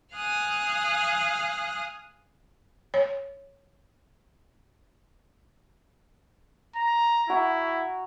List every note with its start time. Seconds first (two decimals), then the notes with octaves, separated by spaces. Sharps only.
0.15 F5 G#5 D#6 F6 F#6
2.94 C#5
6.76 A#5
7.29 E4 F#4 A#5